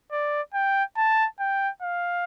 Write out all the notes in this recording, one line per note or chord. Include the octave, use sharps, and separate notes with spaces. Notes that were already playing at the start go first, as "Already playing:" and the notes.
D5
G5
A5
G5
F5